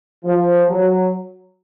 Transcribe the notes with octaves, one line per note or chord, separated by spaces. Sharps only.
F3
F#3